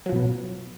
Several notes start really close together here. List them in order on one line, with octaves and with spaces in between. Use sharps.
F#3 F3 B2 B3